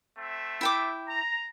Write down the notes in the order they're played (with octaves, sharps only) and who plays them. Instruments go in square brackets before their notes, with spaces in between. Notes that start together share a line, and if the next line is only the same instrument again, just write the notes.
[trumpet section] A3 C4 E5
[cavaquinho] E4 G5 D6
[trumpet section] A#5